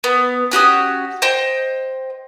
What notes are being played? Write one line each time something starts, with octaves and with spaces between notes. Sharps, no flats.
B3
C#4 F#4 G4 D#6
C5 D#5 G5